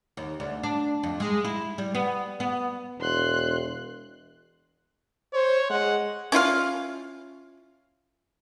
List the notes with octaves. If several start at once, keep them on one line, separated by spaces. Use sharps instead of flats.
D#2
D2
D4
F2
G#3
E4
G3
B3
B3
E1 C6 F#6
C5 C#5
G#3 F#5
C#4 E4 F4 F5